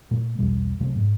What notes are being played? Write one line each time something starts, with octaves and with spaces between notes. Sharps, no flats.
A#2 A3
B1 E2 B2 G3
C#2 C3 F#3 A3
G#2